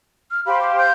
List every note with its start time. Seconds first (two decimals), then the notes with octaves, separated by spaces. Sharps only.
0.31 F6
0.46 G4 C5 F5 B5
0.61 D6
0.78 G6